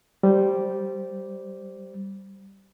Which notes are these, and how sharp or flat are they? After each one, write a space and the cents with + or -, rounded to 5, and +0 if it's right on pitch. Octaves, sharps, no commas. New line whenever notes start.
G3 -10 C5 +0